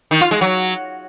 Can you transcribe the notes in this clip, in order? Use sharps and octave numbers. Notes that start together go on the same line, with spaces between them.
D#3
F4
G#3
F#3